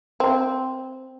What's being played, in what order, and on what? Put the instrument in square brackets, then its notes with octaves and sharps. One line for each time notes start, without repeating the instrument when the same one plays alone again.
[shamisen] C4